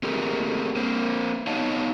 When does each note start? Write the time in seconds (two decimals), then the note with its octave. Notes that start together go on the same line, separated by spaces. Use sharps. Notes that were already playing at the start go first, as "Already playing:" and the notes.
0.03 A3 A#3 C4 G4 G#4 A#4
0.76 A#3 C4
1.47 B3 D#4 C#5 D#5 F5 A5